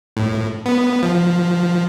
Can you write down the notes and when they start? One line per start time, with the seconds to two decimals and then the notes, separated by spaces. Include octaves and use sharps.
0.17 A2
0.66 B3
1.03 F3